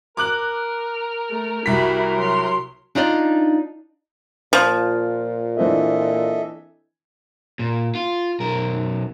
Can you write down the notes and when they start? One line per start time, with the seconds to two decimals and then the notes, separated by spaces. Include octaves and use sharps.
0.17 A#4 D6 F#6 F#7
1.30 A3
1.66 C2 E4 F#4 A#4 B6
2.15 F#3 C6
2.95 D4 D#4 F4 D5 D#5
4.53 A#2 F3
5.57 E3 C4 D4 A4 D#5 E5
7.59 A#2
7.95 F4
8.40 B1 A#4